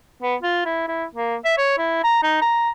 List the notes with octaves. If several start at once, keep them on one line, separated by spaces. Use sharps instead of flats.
B3
F4
E4
E4
A#3
E5
C#5
E4
A#5
D#4
A#5